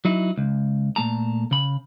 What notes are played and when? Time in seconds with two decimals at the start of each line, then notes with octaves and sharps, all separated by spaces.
0.05 F#3 D#4 E4
0.38 C#2
0.96 A#2 A3 A5 A#5
1.51 C#3 B5